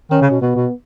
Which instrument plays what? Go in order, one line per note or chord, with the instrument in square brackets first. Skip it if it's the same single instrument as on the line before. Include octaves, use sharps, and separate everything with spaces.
[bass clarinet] D#3 [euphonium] C#4
[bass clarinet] C#3
B2
[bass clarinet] B2 [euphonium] B3
[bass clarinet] B2